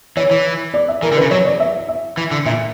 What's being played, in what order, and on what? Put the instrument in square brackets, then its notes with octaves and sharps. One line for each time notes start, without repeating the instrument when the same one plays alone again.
[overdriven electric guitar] E3 [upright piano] C#5
[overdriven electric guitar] E3
[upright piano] D5
E5
[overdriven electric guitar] E3 [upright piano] A#4
[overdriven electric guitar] D3
[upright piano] B4
[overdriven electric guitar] C#3
[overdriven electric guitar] F#3 [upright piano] C#5
[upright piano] D5
E5
E5
[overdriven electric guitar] E3
D3
[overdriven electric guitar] A#2 [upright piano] E5